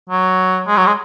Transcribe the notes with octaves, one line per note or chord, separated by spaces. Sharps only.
F#3
G#3
F#3
G#3